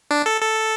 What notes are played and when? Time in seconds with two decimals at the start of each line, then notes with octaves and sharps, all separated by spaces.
0.11 D4
0.26 A4
0.42 A4